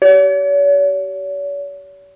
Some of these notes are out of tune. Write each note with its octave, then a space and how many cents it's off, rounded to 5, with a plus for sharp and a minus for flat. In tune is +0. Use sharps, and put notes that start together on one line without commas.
G4 -30 C#5 +45